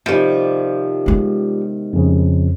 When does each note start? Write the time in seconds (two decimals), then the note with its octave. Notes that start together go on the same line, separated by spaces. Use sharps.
0.06 C3 D#3 F3 G3 G4
1.06 G#3 B3
1.93 F2 C#3